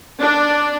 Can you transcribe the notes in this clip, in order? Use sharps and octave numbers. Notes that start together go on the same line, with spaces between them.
D4